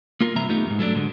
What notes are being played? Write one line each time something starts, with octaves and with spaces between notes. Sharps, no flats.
A#3 F4 A#4
G2 C3 E3 C4 E5 A#5
A3 B3 D#4 F4 G4
F2 G#2
F#3 A3 B3 D4
G#2 D3